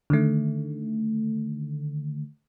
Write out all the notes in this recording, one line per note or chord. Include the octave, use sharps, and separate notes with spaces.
D3 D#3 A3